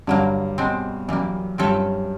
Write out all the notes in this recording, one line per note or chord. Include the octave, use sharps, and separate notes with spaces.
G2 D3 F#3 A#3
B2 G#3 C4
F#2 E3 G3 A#3
G2 C4 F4 A4 C#5 E5